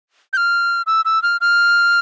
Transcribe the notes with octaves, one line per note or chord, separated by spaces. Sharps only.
G6
F6
E6
E6
F6
F6